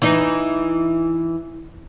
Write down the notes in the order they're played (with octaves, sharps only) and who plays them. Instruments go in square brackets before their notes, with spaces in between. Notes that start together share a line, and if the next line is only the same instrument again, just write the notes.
[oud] E3 D#4